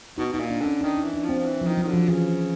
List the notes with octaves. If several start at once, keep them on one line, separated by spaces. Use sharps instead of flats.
B2 D#4
B2 D#4
A#2
D4
D3 C#4
D#3 D4
D#4
E3
D4
F3 C4
F3
E3
F3
D#3
F#3
D#3
D3
F3
C#3 E3